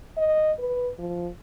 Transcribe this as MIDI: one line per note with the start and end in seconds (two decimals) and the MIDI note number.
0.18 0.52 75
0.59 0.90 71
0.99 1.29 53